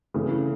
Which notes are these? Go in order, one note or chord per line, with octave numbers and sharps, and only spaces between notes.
C#3 E3 A3